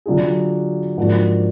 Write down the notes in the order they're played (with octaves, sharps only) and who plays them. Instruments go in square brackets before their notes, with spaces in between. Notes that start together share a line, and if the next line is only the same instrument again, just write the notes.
[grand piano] D3 F#3 D4 F4 G#4
G#2 F3 A#3 D4 F#4